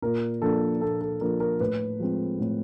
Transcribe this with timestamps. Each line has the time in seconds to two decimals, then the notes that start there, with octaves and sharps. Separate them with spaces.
0.02 A#2 A#4
0.42 F3 A#3 D4 A4
0.81 A#2 A4
1.01 A4
1.21 F3 A#3 D4 A#4
1.40 A#4
1.60 A2 B4
2.00 F3 G#3 C4
2.40 A2